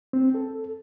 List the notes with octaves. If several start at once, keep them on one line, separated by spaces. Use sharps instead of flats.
C4
A4